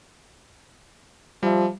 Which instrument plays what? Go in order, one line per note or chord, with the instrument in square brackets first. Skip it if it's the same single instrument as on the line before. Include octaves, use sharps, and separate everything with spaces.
[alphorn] F3 [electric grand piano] G3 E5